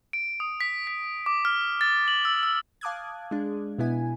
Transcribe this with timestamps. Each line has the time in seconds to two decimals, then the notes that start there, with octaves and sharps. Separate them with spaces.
0.13 D7
0.40 D#6
0.61 B6
0.87 B6
1.26 D6
1.45 F6
1.81 A6
2.08 F#7
2.25 E6
2.43 E6
2.81 F5 A5 D6 D#6 F#6 G#6
3.31 G#3 D4
3.78 B2 B3 E4 G#5